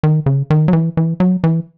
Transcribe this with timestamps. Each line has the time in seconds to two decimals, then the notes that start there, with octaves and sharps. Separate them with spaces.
0.03 D#3
0.26 C#3
0.50 D#3
0.68 F#3
0.73 E3
0.97 E3
1.20 F#3
1.44 E3